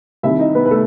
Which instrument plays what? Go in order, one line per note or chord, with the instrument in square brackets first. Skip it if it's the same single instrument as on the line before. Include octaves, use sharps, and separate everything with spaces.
[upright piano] C2 C3 D#3 E4 E5
D#4 D#5
B3 B4
B4
A3 A4